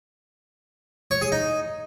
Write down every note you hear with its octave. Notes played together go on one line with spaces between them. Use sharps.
C#5
G#4
D#4